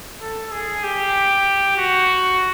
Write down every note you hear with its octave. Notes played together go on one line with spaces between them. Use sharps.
A4
G#4
G4
F#4